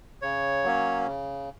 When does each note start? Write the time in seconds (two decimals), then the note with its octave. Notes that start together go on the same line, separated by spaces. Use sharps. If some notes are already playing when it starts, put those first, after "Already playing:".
0.22 C#3 C#5
0.64 F#3 A#3 C#4
1.07 C#3